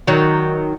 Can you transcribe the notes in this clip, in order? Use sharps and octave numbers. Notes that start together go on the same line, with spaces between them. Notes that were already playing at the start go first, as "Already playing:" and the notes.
D#3 F#3